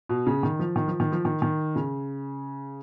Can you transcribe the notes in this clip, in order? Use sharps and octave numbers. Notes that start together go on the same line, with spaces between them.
B2
C#3
D#3
F3
D#3
F3
D#3
F3
D#3
D#3
C#3